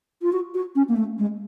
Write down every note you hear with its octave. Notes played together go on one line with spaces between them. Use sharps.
F4
F#4
F#4
C#4
A#3
A3
G#3